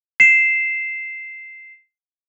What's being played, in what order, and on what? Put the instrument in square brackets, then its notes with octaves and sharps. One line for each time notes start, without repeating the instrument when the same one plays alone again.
[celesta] C7 E7